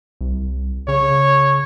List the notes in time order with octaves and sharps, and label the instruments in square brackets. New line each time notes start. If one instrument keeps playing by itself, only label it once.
[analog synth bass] C2
[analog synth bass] C#3 [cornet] C#5